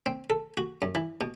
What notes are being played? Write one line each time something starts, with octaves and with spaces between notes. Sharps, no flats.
C4
A4
F#4
F#2
E3
B2